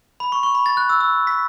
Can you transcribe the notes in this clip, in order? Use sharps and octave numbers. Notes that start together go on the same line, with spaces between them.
B5
C#6
C#6
B5
A6
F#6
E6
E6
B6